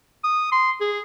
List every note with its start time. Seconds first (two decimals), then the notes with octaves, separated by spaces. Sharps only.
0.24 D#6
0.52 C6
0.81 G#4